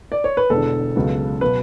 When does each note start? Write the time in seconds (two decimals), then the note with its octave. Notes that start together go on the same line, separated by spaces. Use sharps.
0.12 D5
0.24 C#5
0.37 B4
0.50 E1 E2 D3 A4
0.96 C#2 C#3 F#3 B3
1.41 B2 F#3 B4